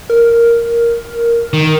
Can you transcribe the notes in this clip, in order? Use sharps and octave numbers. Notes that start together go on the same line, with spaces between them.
A#4
D#3